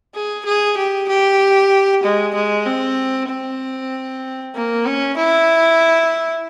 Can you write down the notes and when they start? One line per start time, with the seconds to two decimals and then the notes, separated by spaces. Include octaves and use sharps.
0.15 G#4
0.46 G#4
0.78 G4
1.09 G4
2.03 G#3
2.35 G#3
2.66 C4
3.29 C4
4.55 A#3
4.86 C#4
5.17 E4